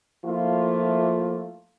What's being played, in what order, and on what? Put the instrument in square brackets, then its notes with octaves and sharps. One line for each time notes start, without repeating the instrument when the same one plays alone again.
[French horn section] F3 A3 A#3 E4 F4